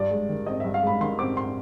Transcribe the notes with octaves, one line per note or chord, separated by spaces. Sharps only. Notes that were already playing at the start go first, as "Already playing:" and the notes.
Already playing: G2 D5
G#3
D#3
C4 D#5
G2 E5
F5
G#3 B5
D#3 C6
C4 D6
C6